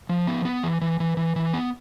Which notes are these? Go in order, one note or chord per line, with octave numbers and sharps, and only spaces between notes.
F3
B3
B3
E3
E3
E3
E3
E3
B3